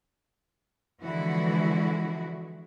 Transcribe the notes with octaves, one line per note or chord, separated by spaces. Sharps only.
D3 E3 F3 G#3 E4 F#4